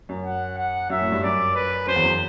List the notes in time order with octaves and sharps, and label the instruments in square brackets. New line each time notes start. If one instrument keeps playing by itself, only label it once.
[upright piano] F#2
[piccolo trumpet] F#5
F#5
[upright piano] F#2 [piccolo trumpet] E5
[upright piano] A2
G2
[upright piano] F#2 [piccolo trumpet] D5
[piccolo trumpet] B4
[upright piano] F#2 [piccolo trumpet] C5
[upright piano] E2
F#2